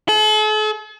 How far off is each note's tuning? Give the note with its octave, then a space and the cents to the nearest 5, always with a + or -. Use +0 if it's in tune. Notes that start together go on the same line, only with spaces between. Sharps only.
A4 -45